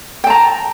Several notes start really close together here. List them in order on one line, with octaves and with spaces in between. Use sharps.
G5 A5 A#5